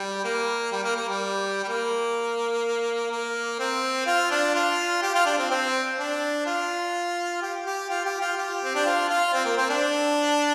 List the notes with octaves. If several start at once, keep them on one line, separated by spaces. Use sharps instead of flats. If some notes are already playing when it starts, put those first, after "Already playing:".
Already playing: G3
A#3
G3
A#3
A#3
G3
G3
A#3
A#3
C4
F4
D4
F4
G4
F4
D4
C4
C4
D4
F4
G4
G4
F4
G4
F4
G4
C4
D4
F4
F4
C4
A#3
C4
D4